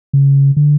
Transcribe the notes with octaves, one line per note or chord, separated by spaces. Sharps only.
C#3
D3